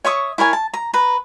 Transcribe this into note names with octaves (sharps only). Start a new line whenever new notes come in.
C#5 E5 C#6 D#6
E4 A#4 C#5 G#5
A5
A#5
B4 A#5